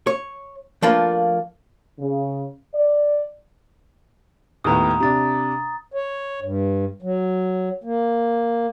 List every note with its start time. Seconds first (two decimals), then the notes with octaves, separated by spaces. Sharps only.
0.07 C#5
0.82 F3 A3 A#3 D4 F4 B4
1.99 C#3
2.74 D5
4.64 D#2 A2 B3 A#5 D#6
5.00 C3 D4 A#5 A6
5.93 C#5
6.42 G2
7.02 F#3
7.84 A#3